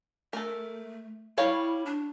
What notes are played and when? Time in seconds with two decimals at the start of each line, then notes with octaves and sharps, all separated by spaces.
0.33 A3 A4 A#4
1.38 G3 E4 C#5 F5
1.86 D4